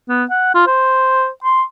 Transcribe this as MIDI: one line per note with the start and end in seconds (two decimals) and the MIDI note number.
0.09 0.24 59
0.30 0.52 78
0.54 0.65 65
0.67 1.28 72
1.44 1.62 84